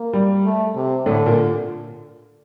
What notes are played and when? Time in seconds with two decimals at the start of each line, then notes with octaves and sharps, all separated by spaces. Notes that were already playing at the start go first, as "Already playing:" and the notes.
Already playing: A#3
0.13 G3
0.44 A3
0.75 C3
1.06 A2 D3 A3
1.26 A#2 A#3